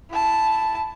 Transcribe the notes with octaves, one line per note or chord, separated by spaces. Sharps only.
E4 A5